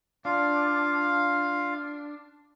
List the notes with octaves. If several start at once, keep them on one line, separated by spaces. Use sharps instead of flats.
D4 F4 F5